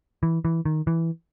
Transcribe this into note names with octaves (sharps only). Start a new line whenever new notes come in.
E3
E3
D#3
E3